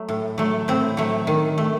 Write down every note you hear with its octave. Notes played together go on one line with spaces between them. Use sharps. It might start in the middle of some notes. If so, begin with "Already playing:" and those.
Already playing: F#3 A3
A2
F#3 A3
A2 C4
F#3 A3
D#3
A3